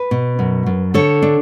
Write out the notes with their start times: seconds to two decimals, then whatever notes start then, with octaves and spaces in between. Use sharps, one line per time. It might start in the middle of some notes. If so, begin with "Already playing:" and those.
Already playing: B4
0.11 B2
0.39 F#2
0.66 F#2
0.94 D3 A4 C#5
1.22 D4